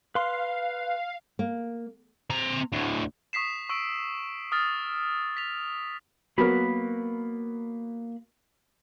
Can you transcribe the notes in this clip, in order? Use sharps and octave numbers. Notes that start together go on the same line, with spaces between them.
B4 F5 C6
A#3
C4 A#5
D2 A2
C#6 D#6 B6 C7 E7
C#6 E6 D7
D#6 F6 A6
B6 F7
F#3 A#3 B3 A#4 B5